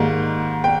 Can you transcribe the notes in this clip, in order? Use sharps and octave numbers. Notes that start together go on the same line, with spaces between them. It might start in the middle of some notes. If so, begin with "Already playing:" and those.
Already playing: G#2 D#3 G3 A#3
G5